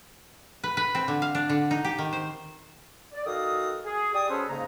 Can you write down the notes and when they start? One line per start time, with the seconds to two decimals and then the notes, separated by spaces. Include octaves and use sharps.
0.64 B4
0.77 B4
0.95 C4
1.08 D3
1.22 F5
1.35 D4
1.50 D3
1.71 D#4
1.85 G4
1.99 D#3
2.13 C5
3.12 D5
3.26 D#3 F#4 A4 F5 D#6
3.85 G#4
4.14 G4 D5 G#5 D#6
4.30 F#3 C#4 G#4 A4 B4 C5
4.49 G#2 C#3 A#3 A#5